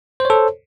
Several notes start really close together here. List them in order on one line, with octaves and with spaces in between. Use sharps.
C5 C#5 A4